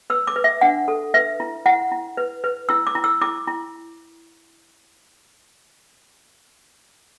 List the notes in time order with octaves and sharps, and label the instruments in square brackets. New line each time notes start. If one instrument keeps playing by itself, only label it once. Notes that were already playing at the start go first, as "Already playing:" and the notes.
[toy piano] B4 E6
D6
B4
E5
D4 F#5
A4
B4 E5
E4
E4 F#5
E4
B4
B4
E4 E6
D6
E4
E6
E4 D6
E4